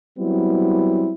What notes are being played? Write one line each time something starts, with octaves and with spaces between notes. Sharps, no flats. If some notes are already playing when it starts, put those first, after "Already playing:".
F#3 G3 B3 C4 E4